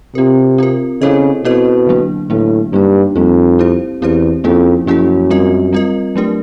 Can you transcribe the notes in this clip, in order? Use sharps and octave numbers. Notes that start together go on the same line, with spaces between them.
C3 C4 F4 A#4
C4 F4 A#4
C#3 C4 E4 A4 C5 D#5
B2 C4 E4 A4 C5 D#5
D3 F#3 A#3 D4
A2 D3 F#3 A#3 D4
G2 G3 A#3 D#4
F2 G3 A#3 D#4
C4 E4 G4 C5
E2 C4 E4 G4 C5
F2 F3 A#3 C#4 E4 G#4
F#2 F3 A#3 C#4 E4 G#4
G3 C4 F4 A#4 D#5
G3 C4 F4 A#4 D#5
F#3 A3 D4 G4 A#4